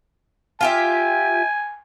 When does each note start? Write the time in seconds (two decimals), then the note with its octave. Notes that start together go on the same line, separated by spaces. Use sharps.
0.61 F4 G4 E5 G#5